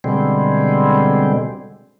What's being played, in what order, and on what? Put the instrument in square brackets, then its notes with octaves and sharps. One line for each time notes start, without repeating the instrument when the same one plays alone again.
[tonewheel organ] B2 D3 G3 G#3 C4